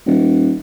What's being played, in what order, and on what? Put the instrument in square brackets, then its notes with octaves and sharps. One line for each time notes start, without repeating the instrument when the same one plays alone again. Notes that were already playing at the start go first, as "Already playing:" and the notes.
[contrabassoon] D#1